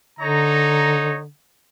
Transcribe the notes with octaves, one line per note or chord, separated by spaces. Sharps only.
D3 D#4 C#5 A#5